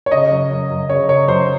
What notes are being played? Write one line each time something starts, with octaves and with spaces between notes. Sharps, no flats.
C#5
C#3 D#5
F#2
F#2
F#2
C#3 C#5
F#2 C#5
F#2 C5